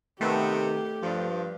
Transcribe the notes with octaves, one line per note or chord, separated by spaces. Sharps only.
C3 D#3 A3 B3 G4
G2 F3